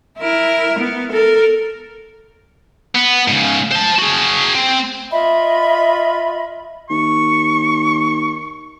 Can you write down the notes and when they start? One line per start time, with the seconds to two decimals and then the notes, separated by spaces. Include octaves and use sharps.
0.18 E4 A#4
0.79 B3
1.12 A4 A#4
2.95 B3
3.28 G#2 C#3
3.72 C5 A5
3.99 F#4 G#4
4.55 C4
5.11 F4 D#5 E5 B5
6.90 D#2 C#6